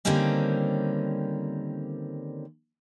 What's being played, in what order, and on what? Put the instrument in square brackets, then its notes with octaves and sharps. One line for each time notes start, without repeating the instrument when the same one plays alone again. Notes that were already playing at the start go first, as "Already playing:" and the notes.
[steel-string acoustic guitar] D3 D#3 G3 A#3 C4 C#4